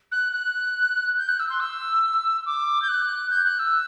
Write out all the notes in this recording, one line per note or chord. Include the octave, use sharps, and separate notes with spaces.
F#6
F#6
G6
F#6
E6
C6
E6
D6
G6
F#6
G6
F#6
E6